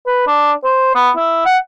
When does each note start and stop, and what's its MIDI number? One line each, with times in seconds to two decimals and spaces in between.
0.07 0.24 71
0.27 0.52 62
0.64 0.91 72
0.95 1.10 59
1.17 1.45 64
1.46 1.58 78